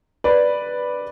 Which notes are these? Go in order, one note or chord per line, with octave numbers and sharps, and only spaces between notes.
B4 D5